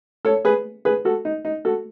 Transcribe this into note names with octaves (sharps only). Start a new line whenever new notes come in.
A4 C#5
G#4 B4
G#4 B4
F#4 A4
D#4
D#4
F#4 A4